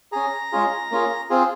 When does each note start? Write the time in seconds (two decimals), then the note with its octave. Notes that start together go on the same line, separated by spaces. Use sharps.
0.12 C#4 G#4 A#5
0.52 G#3 C#4 F4 G#4
0.91 A#3 C#4 F4 G#4
1.30 C4 F4 G#4